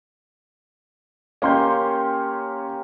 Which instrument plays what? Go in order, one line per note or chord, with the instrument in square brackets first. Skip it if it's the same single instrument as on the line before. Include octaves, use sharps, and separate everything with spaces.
[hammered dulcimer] A#3 G4 [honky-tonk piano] C#4 C6 G6